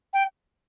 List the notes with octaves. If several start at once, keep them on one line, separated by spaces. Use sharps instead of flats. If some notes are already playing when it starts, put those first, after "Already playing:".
G5